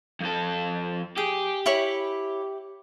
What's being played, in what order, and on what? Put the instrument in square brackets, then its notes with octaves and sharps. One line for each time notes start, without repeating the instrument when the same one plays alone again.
[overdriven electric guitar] F2 A4
[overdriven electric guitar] G4 [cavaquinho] G#4
[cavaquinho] E4 C#5 B5